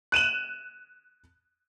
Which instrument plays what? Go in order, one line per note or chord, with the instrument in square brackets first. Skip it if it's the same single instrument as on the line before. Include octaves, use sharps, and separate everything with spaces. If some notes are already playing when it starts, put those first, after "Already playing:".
[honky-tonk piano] F#6 D#7 E7 F#7